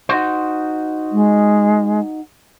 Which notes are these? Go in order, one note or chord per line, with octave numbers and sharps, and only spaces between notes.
D#4 F#4 C5
G#3